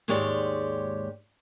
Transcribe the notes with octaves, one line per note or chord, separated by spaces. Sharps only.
D#2 G#2 G#3 G4 C#5 D5